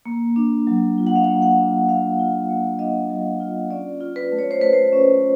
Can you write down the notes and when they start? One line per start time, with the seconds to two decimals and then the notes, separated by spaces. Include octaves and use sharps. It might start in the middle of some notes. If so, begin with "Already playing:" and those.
0.05 A#3
0.36 D4
0.67 F#3
0.98 F4
1.07 F#5
1.16 F5
1.24 F#5
1.28 A#3
1.42 F#5
1.58 D4
1.88 F#3 F5
2.19 F4
2.49 A#3
2.79 D4 D#5
3.10 F#3
3.40 F4
3.70 C#4 D5
4.01 F4
4.16 B4
4.32 A3
4.39 C#5
4.51 C5
4.61 A3 B4
4.73 C5
4.93 C#4